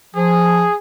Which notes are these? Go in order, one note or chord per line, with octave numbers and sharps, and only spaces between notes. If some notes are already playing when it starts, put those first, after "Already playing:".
F3 G#4